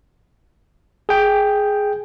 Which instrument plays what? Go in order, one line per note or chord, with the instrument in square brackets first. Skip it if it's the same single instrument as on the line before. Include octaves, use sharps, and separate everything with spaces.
[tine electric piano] G#4 G5